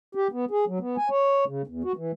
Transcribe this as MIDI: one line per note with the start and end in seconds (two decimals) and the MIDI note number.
0.15 0.28 67
0.32 0.45 59
0.51 0.65 68
0.67 0.79 54
0.80 0.96 59
0.97 1.09 80
1.10 1.45 73
1.47 1.62 49
1.67 1.83 40
1.84 1.92 66
1.96 2.12 52